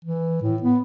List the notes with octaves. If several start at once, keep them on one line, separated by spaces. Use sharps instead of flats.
E3
A2
B3